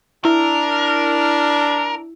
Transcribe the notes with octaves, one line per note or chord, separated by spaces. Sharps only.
D4 E4 A#4